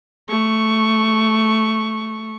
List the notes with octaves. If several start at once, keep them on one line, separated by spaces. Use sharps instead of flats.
A3 C#6